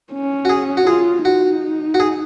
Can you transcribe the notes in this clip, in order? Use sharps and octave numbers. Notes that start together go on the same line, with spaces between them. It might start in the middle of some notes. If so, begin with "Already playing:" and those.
C#4
F#4
G#4
F#4
F4 G#4
D#4 F#4
F#4
G#4